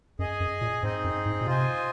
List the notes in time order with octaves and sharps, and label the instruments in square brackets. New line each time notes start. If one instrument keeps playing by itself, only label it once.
[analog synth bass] F#2 [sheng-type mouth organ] G#4 D#5 G#5
[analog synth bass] F#2
A#2
[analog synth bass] G#2 [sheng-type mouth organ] C4 D#4 G#4 D#5
[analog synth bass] F#2
G#2
A#2
[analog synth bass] C3 [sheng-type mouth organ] F4 C5 D#5 G#5